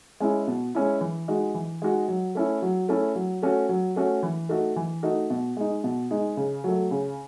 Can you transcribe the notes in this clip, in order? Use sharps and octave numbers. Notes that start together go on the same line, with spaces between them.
G#3 C#4 E4
B2
G#3 C#4 E4
E3
G#3 D#4 F#4
E3
G#3 D#4 F#4
F#3
A3 C#4 E4
F#3
A3 C#4 E4
F#3
A3 C#4 F#4
F#3
A3 C#4 F#4
E3
A3 D#4 F#4
E3
A3 D#4 F#4
B2
G#3 D#4
B2
G#3 D#4
C#3
F#3 A3
C#3